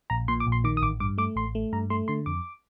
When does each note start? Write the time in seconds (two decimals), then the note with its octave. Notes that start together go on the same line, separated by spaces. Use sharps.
0.10 A#1 A#5
0.28 A#2 C6
0.40 D6
0.47 A#1
0.52 C6
0.64 D#3 D6
0.77 D#6
0.82 A1 D6
1.00 G2 D6
1.18 A3 D6
1.36 A1 C6
1.55 A3
1.73 G2 A#5
1.90 A3 C6
2.08 D3 C6
2.26 F2 D6